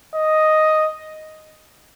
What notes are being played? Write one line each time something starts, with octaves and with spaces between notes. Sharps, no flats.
D#5